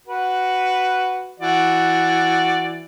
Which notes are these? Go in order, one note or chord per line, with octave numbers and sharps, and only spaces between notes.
F#4 B4
E3 F#4 D5